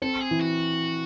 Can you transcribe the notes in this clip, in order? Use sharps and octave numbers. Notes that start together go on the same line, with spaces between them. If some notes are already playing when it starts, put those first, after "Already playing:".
C4 A4
G#4
E3
F#4